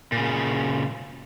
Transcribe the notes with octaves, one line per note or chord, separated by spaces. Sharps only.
A#2 C#3